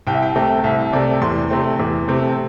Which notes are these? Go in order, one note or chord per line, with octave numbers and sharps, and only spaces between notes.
C2 G5
E5
G5
C3 A3
C2 E5
C3 A3 D5
E2 C6
C3 A3 C4
E2
C3 A3 C4